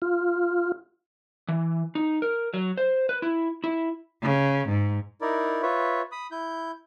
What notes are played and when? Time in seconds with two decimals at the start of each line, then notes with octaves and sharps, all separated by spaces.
0.02 F4
1.48 E3
1.95 D#4
2.22 A#4
2.54 F#3
2.78 C5
3.09 B4
3.22 E4
3.64 E4
4.22 C#3
4.68 G#2
5.21 D#4 E4 A#4 D5
5.62 F4 B4 C#5 E5
6.12 B5 D#6
6.31 E4 G6